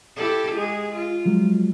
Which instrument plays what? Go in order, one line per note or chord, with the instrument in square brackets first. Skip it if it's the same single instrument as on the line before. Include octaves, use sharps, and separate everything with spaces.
[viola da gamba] E4 G4 A4
G#3 G#4
F4
[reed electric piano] F3 F#3 G#3